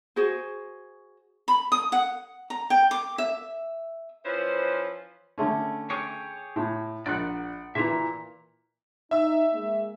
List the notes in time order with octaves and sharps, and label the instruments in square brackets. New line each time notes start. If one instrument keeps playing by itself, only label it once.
[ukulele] F#4 G#4 C5
[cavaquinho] B5
D#6
F#5
A#5
G5
D6
E5
[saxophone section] E3 F3 C#4 B4 C5
[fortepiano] D3 A3 C#4
[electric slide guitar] G4 G#4 C#5
[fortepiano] A2
[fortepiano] A#1 F#6 [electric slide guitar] D5 F#5
[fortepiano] A#2 E3 [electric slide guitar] E5 A5 A#5
[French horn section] D#4 [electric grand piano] E5 E6
[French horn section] G#3 A#3